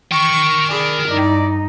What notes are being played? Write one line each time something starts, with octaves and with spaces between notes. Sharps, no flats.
A#4 G5 C#6
D4 G#4 D5 B5
G2 D#4 E4 D5